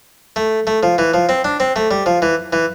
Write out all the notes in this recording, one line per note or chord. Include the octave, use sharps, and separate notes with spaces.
A3
A3
F3
E3
F3
C4
D4
C4
A3
G3
F3
E3
E3